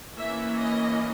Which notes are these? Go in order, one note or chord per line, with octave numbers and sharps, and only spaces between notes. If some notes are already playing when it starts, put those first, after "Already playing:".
E3 A#3 C#4 E5
D#5